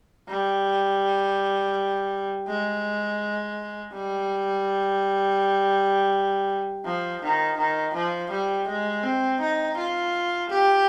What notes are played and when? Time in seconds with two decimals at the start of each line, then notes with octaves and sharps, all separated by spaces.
0.29 G3
2.47 G#3
3.93 G3
6.85 F3
7.21 D#3
7.58 D#3
7.94 F3
8.31 G3
8.68 G#3
9.03 C4
9.40 D#4
9.77 F4
10.49 G4